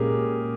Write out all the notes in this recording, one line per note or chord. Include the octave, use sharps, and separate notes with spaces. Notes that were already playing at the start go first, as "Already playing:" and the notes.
Already playing: A#2 G#3 C#4 G4 G#4 A#4